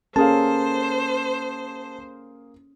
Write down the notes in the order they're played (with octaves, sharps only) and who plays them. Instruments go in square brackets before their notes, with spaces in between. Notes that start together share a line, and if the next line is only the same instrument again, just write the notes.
[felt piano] A#3 G#4 F5 [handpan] C#4 A4 [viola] C5 [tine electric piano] A5